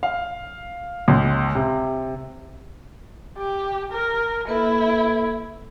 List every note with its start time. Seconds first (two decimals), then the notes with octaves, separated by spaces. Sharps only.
0.03 F5
1.08 C#2
1.55 C3
3.37 G4
3.92 A#4
4.48 A#3 E4 A4 B4